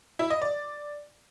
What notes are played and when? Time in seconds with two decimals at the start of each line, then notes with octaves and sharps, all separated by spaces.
0.19 E4
0.30 D#5
0.42 D5